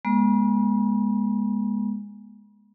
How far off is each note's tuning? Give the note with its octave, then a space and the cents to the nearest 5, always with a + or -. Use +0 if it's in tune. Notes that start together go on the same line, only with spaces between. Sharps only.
G#3 -10 B3 -45